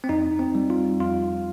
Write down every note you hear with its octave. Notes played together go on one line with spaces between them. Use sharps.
C4
F2 D#4
C4
G3
F4
F2 F4